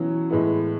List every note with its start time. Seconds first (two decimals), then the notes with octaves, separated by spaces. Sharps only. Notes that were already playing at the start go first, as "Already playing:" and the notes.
Already playing: B2 E3 F#3 C#4
0.30 A2 G#3 B3 E4